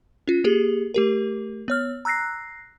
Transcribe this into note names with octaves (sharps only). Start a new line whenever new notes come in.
C#4 F4
A#3 G4 G#4
A3 G4 A#4
B3 C#5 F6
A#5 E6 F#6 A#6 C7